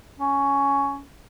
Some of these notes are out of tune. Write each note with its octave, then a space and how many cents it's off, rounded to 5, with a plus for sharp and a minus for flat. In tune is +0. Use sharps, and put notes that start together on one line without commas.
C#4 +10